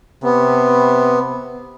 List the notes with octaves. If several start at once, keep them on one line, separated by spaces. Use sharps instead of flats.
C3 B3